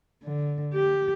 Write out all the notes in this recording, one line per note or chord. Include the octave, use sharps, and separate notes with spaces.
D3
G4